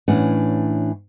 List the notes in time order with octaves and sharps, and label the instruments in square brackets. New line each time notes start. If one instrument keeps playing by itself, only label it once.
[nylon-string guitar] A2 E3 C#4 D4 F#5